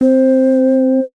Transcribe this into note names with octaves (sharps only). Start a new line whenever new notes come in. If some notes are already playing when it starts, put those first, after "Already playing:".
C4 C5